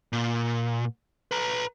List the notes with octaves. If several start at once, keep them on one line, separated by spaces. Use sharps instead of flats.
A#2
B4 A#5